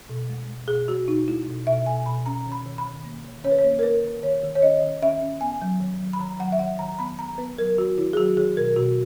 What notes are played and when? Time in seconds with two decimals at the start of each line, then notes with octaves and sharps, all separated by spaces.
0.09 B2
0.29 G#3
0.48 G#3
0.68 B2 G#4
0.88 G#3 F#4
1.07 B2 D#4
1.28 G#3 E4
1.47 B2
1.67 B2 E5
1.86 B2 G#5
2.06 B2 B5
2.26 C#4 A#5
2.46 D#3
2.52 B5
2.66 D#3
2.78 B5
2.85 D#3
3.04 A#3
3.25 D#3
3.44 C#4 C#5
3.51 B4
3.59 C#5
3.64 A#3
3.79 A#4
3.83 A#3 B4
4.03 D#3
4.23 D#3 C#5
4.43 D#3
4.55 C#5
4.62 C#4 D#5
4.82 D#3
5.03 C#4 E5
5.21 C#4
5.41 B3 G#5
5.62 F#3
5.80 D#3
6.00 F#3
6.13 B5
6.20 D#3 A#5
6.40 F#3 F#5
6.52 E5
6.59 D#3 F#5
6.79 D#3 A#5
6.99 B3 B5
7.19 B3 A#5
7.38 B3 B4
7.58 F#3 A#4
7.77 D#3 F#4
7.98 D#3 E4
8.13 G#4
8.17 F#3 F#4
8.37 D#3 G#4
8.57 B2 A#4
8.76 B2 F#4